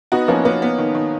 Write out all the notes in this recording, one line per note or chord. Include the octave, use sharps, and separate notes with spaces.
B3 D#4 F#4
F3 A#3 C#4
A#3 B3 C#4
B3
D#3
D#3